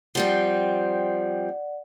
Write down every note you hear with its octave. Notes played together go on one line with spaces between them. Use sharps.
F3 G3 C4 D5 F#5